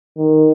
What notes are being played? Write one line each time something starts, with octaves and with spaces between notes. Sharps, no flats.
D#3